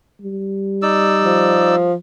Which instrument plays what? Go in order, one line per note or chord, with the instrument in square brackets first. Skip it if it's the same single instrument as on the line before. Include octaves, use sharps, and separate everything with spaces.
[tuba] G3
[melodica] D#4 D5 E6
[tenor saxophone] F3